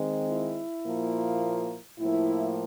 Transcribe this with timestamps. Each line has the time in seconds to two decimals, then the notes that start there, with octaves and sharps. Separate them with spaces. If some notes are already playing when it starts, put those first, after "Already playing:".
Already playing: D#3 G#3 C4
0.28 E4
0.85 A#2 F3 A#3
1.99 A2 F3 A#3 E4